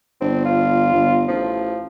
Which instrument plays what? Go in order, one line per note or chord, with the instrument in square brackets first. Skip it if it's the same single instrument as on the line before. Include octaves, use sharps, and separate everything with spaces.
[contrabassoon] G1 [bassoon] C4
[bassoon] F4
[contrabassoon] G1
[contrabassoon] A1 [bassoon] F3